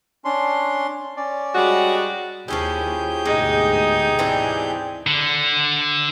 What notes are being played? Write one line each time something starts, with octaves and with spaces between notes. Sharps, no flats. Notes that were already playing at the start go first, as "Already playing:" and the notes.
C#4 D4 C6
C#4 D5
G3 G#3 F#4
D#2 F3 C#4 E4 G4 G#4 G6
D2 G#2 B2 G#3 D#4
E3 C4 D4
D3